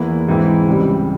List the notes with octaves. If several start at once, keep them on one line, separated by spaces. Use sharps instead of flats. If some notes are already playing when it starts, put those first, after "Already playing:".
Already playing: E2 E3 A#3 E4
G#2 E3 G#3 C4 E4
C#2 C3 G3